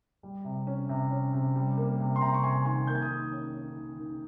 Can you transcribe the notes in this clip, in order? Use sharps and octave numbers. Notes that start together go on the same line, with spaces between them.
G3
C3
C#4
C3
C#4
C3
G3
A#3
C3
C6
C3 G5 A#5
C#6
C3 G#5 C6
D#3 G#5 C6
A#3 G6
G#6
D#6 G6
D#3
C#4
C#4
D#3
D#3